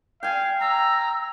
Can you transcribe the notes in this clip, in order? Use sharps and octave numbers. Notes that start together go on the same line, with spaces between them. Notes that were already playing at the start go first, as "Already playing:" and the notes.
F5 G5 G#5
A#5 E6